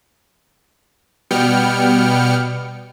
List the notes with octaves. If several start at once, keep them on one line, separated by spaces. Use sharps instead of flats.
B2 G3 B3 G5 F6 C#7